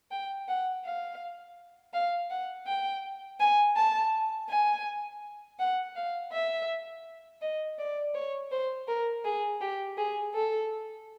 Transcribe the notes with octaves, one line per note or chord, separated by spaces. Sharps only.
G5
F#5
F5
F5
F#5
G5
G#5
A5
G#5
F#5
F5
E5
D#5
D5
C#5
C5
A#4
G#4
G4
G#4
A4